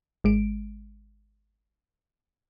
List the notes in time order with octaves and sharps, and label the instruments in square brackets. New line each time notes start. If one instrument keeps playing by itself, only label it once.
[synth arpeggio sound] G#1 G#3 D7